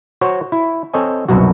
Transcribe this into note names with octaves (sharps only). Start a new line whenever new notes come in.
F#4 C5 C#5
E4
C4 A4 C#5 D#5 G#5
C2 F#2 B2 F#3 F#4